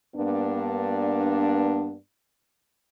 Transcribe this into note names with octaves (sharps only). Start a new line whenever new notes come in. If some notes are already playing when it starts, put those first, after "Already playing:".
G2 A#3 B3 D4